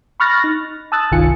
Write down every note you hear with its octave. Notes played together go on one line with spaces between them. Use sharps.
B5 C#6 F6 F#6 A6 A#6
D#4
A5 D#6 E6 F#6 A6
G1 C2 D#3 F4 G#5 C#7